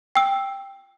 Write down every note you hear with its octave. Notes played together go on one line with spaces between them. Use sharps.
G5 E6